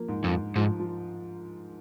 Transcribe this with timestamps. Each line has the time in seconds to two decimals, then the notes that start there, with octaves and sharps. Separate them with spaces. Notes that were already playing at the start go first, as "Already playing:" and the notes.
Already playing: F3 A#3
0.08 G#2
0.24 F2
0.32 G#2
0.56 G#2 F3
0.80 F3